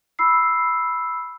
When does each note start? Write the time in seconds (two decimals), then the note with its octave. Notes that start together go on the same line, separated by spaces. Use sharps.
0.19 B5 E6 C7